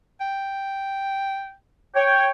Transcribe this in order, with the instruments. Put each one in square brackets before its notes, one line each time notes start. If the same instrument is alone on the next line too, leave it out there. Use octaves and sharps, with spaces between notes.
[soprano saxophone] G5
[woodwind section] C#5 G5